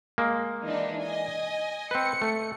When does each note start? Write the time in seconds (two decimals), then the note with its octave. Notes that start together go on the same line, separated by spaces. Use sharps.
0.18 G#3 A#3
0.65 E3 D4 D#4
1.02 D#5 G#5
1.91 C4 B4 C#7
2.22 A3